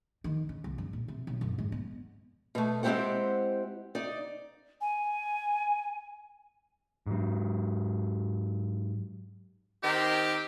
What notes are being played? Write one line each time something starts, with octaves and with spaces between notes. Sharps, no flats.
D#3
C#3
C2
G2
A#2
C3
B1
F#2
G#2
B3
B2 A3
G#3 C4 E4 G4 C5 F#5
D#4 D5
G#5
G#2 F#3
D#3 C4 G4